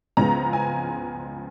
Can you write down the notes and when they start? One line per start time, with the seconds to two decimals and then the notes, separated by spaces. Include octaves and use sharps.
0.17 C#2 C#3 F3 G#3 B3 A#5
0.53 G#5